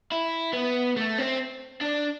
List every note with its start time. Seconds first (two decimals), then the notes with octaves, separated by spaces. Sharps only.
0.12 E4
0.53 B3
0.97 A3
1.18 C4
1.81 D4